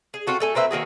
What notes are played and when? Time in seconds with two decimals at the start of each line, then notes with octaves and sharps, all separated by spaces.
0.14 G#4
0.27 C4 F4 F#4 A4
0.40 A3 A4 G#5
0.55 A#3 C4 B4 E5
0.71 D#3 A#3 F#4 G#4